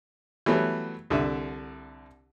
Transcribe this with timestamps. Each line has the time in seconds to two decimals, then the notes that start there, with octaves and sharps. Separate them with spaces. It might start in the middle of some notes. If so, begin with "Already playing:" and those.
0.46 E3 F#3 G3 A3 B3
1.10 C2 D3 E5